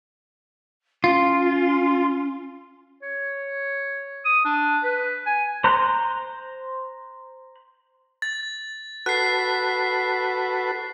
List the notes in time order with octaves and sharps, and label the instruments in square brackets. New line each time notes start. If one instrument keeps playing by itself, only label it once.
[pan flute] C#4 [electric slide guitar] F4
[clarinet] C#5
D#6
D4
B4
G#5
[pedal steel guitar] C5 A#5 C6 F#6
[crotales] A6
[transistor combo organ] F#4 A4 B4 [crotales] F#6 C7